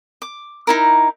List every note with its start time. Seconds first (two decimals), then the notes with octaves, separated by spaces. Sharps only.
0.22 D6
0.67 D#4 E4 A#4